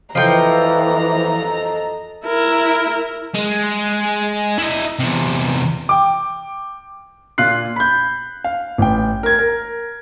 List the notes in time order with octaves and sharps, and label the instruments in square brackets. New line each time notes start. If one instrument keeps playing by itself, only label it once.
[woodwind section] F2 A4 D#5 [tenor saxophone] E3 [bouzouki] F3 G5 [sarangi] A#5
[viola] E4 A#4
[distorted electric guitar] G#3
E4 D#5
E2 C3
[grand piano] G5 D6
A#2 F4 F#6 C7
B5 G6
F5
A1 G5
A#4 G#6
A#4